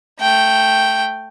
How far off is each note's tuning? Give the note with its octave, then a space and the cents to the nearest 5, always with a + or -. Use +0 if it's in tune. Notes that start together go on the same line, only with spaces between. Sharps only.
A3 +0 G5 +0